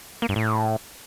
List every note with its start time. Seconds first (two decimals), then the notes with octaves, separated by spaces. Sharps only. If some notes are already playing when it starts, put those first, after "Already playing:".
0.22 A#3
0.29 G2
0.36 A2